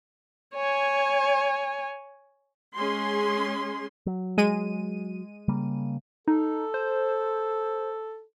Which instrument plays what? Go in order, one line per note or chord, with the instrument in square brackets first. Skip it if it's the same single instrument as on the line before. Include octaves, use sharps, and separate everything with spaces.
[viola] C#5 G#5
[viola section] G#3 C#4 G#4 C6
[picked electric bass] F#3
[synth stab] G#3 D#7
[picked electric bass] C#3 G3 A#3
[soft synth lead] D#4 [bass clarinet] A4
[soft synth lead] C5